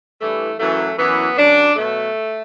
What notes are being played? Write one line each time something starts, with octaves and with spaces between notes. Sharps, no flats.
G2 E3 A3
F#2 E3 A3
F#2 E3 B3
F#2 D3 F#3 D4
B2 F#3 A3